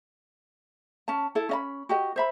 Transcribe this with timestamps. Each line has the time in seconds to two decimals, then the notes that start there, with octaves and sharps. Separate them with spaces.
1.08 C#4 A5
1.35 E4 A4
1.49 C#4 D#5 B5
1.89 F#4 G4 D#5
2.16 C5 E5 B5